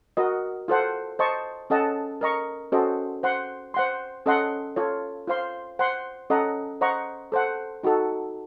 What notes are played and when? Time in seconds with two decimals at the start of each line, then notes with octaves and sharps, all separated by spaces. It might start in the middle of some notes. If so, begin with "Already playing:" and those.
0.17 F#4 A#4 D#5
0.68 F4 A4 C5 F#5
1.19 C5 D#5 A5 C#6
1.70 C#4 A4 D#5 F#5 A5
2.21 A#4 D#5 A#5 C#6
2.72 C#4 F#4 A4 C5 D#5
3.23 C5 F#5 C6
3.74 C5 F#5 C6
4.26 C#4 A4 D#5 F#5 C6
4.76 F4 A4 C#5
5.27 F4 C5 F5 C6
5.79 C5 F#5 C6
6.30 C#4 A4 D#5 F#5 A#5
6.81 C5 D#5 F#5 A#5 C#6
7.32 A4 C5 F#5
7.83 D#4 F#4 A4